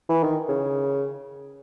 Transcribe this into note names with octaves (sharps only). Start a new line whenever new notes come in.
E3
D#3
C#3